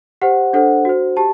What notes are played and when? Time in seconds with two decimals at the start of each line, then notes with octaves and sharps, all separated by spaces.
0.21 G4 C5 F#5
0.53 D4 A4 C5 F#5
0.85 F#4 C5
1.17 G4 A5